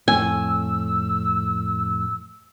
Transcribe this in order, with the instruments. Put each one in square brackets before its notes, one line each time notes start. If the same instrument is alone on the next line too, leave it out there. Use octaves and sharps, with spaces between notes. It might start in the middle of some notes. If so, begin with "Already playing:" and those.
[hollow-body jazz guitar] F2 A2 [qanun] G#5 [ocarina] E6